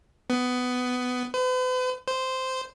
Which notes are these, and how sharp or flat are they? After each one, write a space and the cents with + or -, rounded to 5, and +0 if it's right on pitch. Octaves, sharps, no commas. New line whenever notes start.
B3 +15
B4 +45
C5 -10